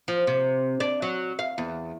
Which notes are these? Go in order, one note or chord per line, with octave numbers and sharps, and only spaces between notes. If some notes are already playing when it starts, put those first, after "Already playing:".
F3
C3
D4
F#3
F5
E2